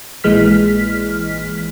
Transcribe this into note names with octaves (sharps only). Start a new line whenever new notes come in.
A#1 A#2 E3 G#3 F6 B6